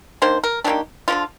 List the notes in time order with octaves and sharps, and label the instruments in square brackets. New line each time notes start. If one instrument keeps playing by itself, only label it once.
[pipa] D#3 A#3 D4 C5
A#4
D#3 G3 A#3 D4 G4
D3 F3 A#3 D4 F4